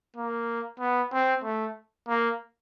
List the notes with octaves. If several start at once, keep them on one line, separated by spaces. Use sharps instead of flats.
A#3
B3
C4
A3
A#3